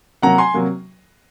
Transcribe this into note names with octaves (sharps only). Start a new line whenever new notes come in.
C3 F#3 A#3 F#5 A#5
G#5 C6
C3 F#3 A#3